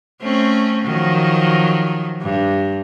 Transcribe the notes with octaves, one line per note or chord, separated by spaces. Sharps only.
A3 C4 C#4
D#3 F3 F#3
G2